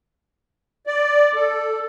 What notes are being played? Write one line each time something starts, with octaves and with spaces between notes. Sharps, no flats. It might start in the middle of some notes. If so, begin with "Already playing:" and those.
D5
A4